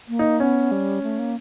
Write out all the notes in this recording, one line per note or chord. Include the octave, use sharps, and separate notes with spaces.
A#3
D#4
B3 C#4
G3
A3
A#3